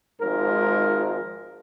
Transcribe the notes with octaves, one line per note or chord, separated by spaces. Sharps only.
G#1 G#2 F3 A#4